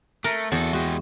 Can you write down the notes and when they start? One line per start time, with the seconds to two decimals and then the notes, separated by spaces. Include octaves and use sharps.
0.24 A3 A#4
0.52 E2 F#4 A4
0.73 G#3 F#4 G4